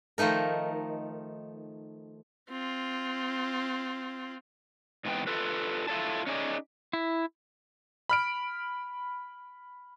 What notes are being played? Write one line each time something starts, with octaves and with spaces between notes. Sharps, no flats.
D#3 F3 A3 D#4 A#4
C4 F4
G#2 C3 E3 B3 G5
F4 A4 B4
E4 F4 A4 C#5 D5 A5
C#4 D#4 G#4 D5
E4
B5 F6 D7